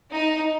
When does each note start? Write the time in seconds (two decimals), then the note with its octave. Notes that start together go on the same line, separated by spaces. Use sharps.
0.12 D#4